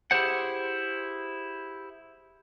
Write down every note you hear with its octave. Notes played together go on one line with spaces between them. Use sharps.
E4 G4 G#4 C5 F#5